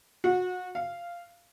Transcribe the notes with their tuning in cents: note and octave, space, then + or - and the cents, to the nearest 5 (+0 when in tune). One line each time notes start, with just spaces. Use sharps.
F#4 -25
F5 -10